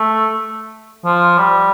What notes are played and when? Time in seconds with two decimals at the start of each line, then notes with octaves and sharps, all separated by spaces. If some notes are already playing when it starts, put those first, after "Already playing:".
Already playing: A3
1.05 F3
1.38 G3